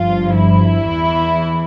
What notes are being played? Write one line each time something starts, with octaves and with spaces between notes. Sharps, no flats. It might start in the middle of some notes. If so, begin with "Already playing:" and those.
Already playing: G1 G2 F3 F4
E4
E2 E3